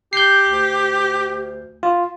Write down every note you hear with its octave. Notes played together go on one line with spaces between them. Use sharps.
G4 G6 C7
D2
F4